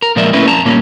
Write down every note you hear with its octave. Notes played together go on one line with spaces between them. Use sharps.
A#4
A#2 F3 G#3 A#4 D5 E5
A3 A#3 C#4 E4 B4
F2 A5 A#5
A#2 G3 A#3 C#4